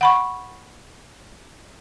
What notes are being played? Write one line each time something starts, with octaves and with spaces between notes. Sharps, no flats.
F#5 B5 C#6